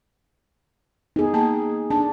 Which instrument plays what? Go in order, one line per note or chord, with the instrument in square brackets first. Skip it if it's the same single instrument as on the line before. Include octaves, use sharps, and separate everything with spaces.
[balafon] B3 [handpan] D#4 G#4
[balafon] A#3 A5 A#5
[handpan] D4 [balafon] A5